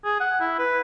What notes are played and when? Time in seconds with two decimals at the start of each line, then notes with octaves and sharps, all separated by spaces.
0.04 G#4
0.20 F#5
0.41 E4
0.59 B4